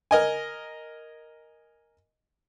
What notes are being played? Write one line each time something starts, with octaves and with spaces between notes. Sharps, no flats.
A#4 D#5 G#5